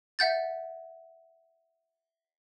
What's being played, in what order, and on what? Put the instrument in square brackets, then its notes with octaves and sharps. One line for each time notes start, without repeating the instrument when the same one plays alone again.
[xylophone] E5 F#5 G6 A6